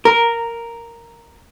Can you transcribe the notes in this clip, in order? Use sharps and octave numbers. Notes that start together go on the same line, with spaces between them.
A#4